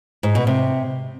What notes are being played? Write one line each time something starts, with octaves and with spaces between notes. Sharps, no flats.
G#2
B2
C3